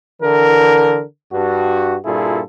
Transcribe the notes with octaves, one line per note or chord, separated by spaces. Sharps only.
D3 E3 A#4
G2 F#4
G2 A#2 E4 F4 G#4 A4